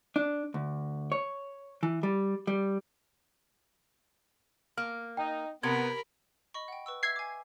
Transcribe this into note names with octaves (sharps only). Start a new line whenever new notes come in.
D4
D2
C#5
E3
G3
G3
A#3 F6
D#4 G5
C3 B3 A#4 B5 G#6
D#5 B5 C#6
F#5 G5
B4 C#6 E6
E5 E6 G#6 B6 C7
G#5 D6